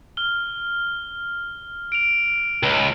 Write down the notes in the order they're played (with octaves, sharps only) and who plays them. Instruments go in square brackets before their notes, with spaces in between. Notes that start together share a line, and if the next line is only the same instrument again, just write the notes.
[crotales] F6 G7
D7 F7
[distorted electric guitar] C#2